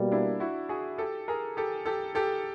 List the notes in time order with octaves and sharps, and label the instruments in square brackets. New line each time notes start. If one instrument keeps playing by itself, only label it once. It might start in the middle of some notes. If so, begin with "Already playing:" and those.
Already playing: [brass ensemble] B2 G3 A#3
[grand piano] D4 E4
E4 F#4
F#4 G#4
G4 A4
G#4 A#4
G4 A4
G4 A4
G4 A4